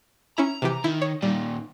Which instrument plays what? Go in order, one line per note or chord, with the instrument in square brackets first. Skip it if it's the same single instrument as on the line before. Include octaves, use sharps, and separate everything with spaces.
[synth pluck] C#4 E4 [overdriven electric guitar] A#5
[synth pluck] C3 E3 G4
[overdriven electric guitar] D#3 [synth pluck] E4
[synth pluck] C#5
[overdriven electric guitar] A#2 D#3 [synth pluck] G3